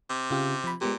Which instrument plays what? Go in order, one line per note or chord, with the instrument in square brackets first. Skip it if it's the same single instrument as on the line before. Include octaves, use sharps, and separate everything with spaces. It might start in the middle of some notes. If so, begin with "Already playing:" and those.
[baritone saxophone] C3
[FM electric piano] C#3 F4 G4
F3 B5
[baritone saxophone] A#2 [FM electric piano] G#3 B3 G4